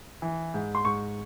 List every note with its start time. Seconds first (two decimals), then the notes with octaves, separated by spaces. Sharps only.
0.22 E3
0.54 G#2
0.75 C6
0.85 G#2 C#6